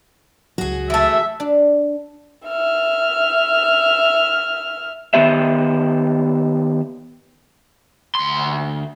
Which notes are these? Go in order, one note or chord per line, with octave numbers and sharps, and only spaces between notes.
C#2 F#3 F#4 G#4
E3 A3 E5
D4
E5 F6
D#3 B3 G4 E5
D2 C6